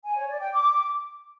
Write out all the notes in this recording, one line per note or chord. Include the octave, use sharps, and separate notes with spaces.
G#5
C#5
D5
G5
D6